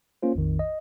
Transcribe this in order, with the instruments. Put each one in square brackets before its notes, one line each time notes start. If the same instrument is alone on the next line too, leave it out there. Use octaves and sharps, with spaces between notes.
[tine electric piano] A#3 C#4 F4 C5
A#1 F2 D#3
D#5